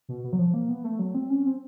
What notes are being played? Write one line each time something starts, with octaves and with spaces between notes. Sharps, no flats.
B2
B2
F#3
F3
A#3
B3
A3
F#3
C4
C#4
C4